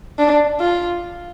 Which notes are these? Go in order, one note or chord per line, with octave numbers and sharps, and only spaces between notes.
D4
F4